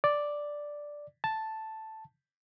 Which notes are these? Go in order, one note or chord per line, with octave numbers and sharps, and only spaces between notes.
D5
A5